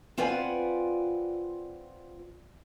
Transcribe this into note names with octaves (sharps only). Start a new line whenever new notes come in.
C4 F4 B4 D5 F#5 G#5